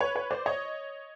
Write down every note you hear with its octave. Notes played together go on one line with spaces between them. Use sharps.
B4 C#5
B4 C#5
C5 D5
C#5 D#5